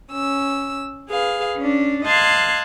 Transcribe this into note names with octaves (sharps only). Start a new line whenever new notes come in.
C#4 E6
G#4 B4 F5
C#4 D4
D#5 F5 A5 C6 F#6 G#6